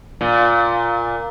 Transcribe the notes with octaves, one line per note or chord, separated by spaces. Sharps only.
A#2